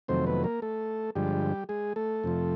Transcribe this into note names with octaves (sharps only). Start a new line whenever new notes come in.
F2 C3 D#3 F#3 A3 C4 C5
B3 B4
A#3 A#4
A3 A4
G2 D3 F3 G3 G#3 G4
G#3 G#4
A3 A4
F2 C3 F3